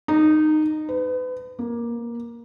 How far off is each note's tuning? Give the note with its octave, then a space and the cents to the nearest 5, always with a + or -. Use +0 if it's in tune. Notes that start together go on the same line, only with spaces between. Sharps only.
D#4 -15
B4 +35
A#3 +15